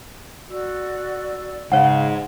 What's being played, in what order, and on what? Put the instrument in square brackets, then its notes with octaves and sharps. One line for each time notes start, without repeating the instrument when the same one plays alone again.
[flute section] F#4 D5 E6
[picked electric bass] G#2 [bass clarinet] C#3 [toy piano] C#5 F5 F#5